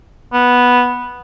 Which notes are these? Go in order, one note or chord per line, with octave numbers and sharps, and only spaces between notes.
B3